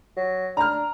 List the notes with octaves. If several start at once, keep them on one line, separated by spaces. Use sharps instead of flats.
F#3
D4 A#5 F6